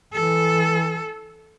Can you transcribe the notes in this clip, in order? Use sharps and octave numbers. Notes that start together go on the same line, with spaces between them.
E3 A4